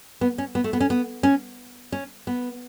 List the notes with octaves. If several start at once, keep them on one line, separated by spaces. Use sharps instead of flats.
B3
C#4
B3
A3
B3
C#4
B3
C#4
C#4
B3